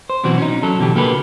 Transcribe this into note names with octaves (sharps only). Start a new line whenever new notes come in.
C5
B2 E3 F#3 C4 F#4
C#4 D#4
F#3 A4
B2 D3 E3 G4
C#3 A#3 F#4 G4 A4 B4